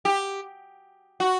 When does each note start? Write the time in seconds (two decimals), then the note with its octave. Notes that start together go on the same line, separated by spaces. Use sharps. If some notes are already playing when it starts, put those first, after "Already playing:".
0.05 G4
1.20 F#4